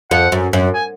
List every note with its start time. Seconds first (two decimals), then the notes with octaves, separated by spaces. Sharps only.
0.11 F2 F#5
0.32 F#2
0.53 F#2
0.74 G#5